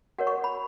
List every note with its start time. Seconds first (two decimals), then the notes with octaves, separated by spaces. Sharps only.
0.18 F#4 A#4 C#5 F#5
0.27 C#6
0.44 B5